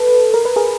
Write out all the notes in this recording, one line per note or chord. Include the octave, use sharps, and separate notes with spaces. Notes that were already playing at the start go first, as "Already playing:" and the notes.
Already playing: A4 B4
A#4
B4
G#4 A#4